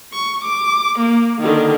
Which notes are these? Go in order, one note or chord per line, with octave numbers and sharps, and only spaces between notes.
C#6
D6
A#3
D3 D#3